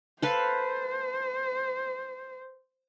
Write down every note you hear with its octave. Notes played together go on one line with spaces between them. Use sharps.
A4 B4 C5 F5